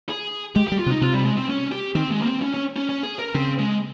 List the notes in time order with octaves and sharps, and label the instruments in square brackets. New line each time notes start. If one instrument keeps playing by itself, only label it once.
[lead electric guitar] G#4
[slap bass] G#3 [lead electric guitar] G4
[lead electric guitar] G4
[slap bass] G3
[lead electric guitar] F4
[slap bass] C3
[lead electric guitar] D#4
[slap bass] C3 [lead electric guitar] F4
[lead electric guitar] G3
G#3
C4
C#4
G4
[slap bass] D#3 [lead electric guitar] C4
[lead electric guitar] G#3
A#3
C4
C#4
C#4
C#4
C#4
G#4
A#4
[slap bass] C#3 [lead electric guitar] C4
[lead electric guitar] G#3